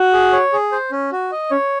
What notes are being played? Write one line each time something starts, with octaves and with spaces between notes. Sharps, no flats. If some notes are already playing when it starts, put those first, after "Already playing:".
Already playing: F#4
G#4
C#5
G#4
C5
C#4
F#4
D#5
C#4 C#5